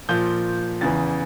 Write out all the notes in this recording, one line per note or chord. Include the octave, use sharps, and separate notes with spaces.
A#2 F3 G6
E2 C#3 E3 A6